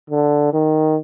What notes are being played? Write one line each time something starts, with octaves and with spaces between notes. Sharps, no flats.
D3
D#3